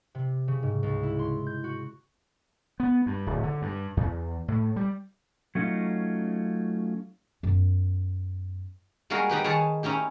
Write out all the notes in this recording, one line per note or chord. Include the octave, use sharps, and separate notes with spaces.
C3
C#3
G#2
C#2
E4
C6
G6
F#4
B3
G2
D1
D3
G2
E2
A2
G3
F#3 A3 C#4 D#4 F4
F#2 B3
G3 G#3 A#3 F#4 G#4 A#4
G3 D#4 G4 B4
D#3 G#4 C#5 G#5 A5
C#4 D#4 E4 G4